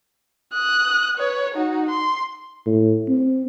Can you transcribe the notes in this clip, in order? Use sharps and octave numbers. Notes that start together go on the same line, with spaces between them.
D#6 F#6
B4 C#5
D#4 F#4
C6
A2
C4